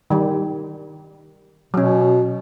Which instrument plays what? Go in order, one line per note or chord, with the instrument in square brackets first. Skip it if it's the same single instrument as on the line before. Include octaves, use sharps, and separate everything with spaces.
[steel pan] D#3 G3
[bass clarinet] B2 [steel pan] F#3 C#4